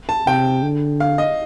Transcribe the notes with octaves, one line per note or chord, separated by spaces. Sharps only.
A5
C3 G5
D3
F5
D#5